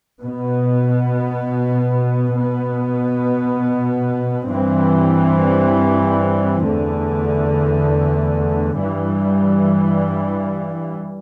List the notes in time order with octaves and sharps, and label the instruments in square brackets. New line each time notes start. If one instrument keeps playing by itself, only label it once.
[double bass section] B2 B3
B2 B3
G2 E3 G3 C4
E2 D3 A3
G2 E3 G3